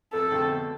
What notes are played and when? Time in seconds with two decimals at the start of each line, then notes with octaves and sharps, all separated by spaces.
0.13 F2 A4
0.32 D3 A3 C4
0.49 B2